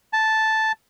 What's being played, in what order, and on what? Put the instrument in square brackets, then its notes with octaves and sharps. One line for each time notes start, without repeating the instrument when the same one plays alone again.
[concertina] A5